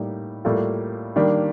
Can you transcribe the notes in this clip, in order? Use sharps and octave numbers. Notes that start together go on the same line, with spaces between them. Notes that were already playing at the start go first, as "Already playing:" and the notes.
Already playing: A2 G3 A#3 D#4 G4
A2 G3 A#3 F4 A4
D#3 G3 A#3 D4